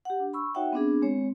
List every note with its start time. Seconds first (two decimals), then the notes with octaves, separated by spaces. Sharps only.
0.05 G4 F#5
0.20 D4
0.33 B5 C#6 E6
0.55 D#4 F#4 C#5 E5 F#5 G5
0.73 B3 C4 D4 G#4
1.02 G#3 C4 C#5